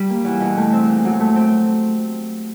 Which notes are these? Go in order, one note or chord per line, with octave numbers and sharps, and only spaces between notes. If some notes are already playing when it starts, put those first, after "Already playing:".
Already playing: G3
A#3
E2
B2
A3
C4
A#2
F#3
A3
C4